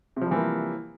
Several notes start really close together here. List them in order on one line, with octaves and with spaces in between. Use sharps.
C3 F3 G3 E3 A#3